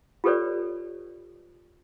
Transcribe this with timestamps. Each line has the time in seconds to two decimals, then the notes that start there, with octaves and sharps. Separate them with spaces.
0.24 F4 G4 A4 B4 C#5 D5